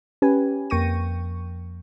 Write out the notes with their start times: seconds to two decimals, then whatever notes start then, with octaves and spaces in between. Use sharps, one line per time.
0.22 C#4 G4 B4 G#5
0.70 F2 A#3 G5 C#6 A#6 D#7